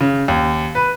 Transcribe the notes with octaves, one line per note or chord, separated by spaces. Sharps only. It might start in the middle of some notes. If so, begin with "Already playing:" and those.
C#3
D#2
B4